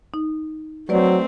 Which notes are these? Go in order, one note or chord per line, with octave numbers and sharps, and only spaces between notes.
D#4
F#3 A3 C4 B4 D5